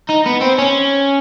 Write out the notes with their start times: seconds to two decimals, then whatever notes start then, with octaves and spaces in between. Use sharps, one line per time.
0.09 D#4
0.26 B3
0.41 C4
0.58 C#4